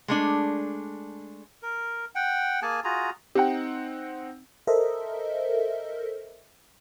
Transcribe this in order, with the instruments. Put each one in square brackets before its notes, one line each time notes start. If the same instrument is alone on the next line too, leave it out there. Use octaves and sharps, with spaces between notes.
[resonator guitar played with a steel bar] G#3 A3 D4
[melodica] A#4
F#5 G5
A#3 G#4 G#5 A5
F4 F#4 G#4 A#5
[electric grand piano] C4 D#4 F#5 [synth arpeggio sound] G4 G5
[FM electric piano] A4 A#4 C5 D#5 E5